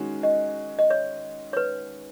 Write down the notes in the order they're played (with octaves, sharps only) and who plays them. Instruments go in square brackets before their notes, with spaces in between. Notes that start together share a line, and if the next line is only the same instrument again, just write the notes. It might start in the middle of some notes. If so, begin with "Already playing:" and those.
Already playing: [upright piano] D#3 G#3 C#4 F#4
[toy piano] D#5
D#5
C#5
C#5
B4